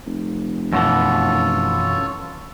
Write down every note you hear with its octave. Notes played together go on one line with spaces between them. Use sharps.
F1
F#2 B2 E3 F4 A4 C#5